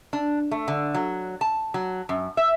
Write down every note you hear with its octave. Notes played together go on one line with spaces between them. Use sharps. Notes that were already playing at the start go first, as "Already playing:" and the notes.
D4
A3
D3
F#3
A5
F#3
F#2
E5